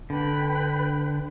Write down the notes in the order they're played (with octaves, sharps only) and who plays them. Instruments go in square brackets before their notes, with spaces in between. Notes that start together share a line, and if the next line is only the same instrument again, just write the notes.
[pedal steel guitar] D3 [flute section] B4 G5 B5